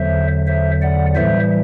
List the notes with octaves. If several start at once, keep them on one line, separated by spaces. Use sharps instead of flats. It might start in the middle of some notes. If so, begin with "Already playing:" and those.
Already playing: E2 D3 F#3 C5 E5
C5 E5
D5 F#5
A2 E3 G3 C5 E5